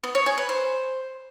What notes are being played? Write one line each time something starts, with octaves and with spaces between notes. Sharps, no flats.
B3
C#5
G#4
B4
C5